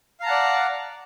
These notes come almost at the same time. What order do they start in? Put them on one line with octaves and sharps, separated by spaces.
F5 A#5 A5 F#5 D5